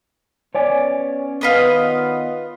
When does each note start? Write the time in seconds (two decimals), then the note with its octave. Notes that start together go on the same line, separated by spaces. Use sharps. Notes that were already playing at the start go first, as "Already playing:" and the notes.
0.55 B3 C#4 C#5 D5 G#5
1.41 D#3 B3 F4 B4 D#5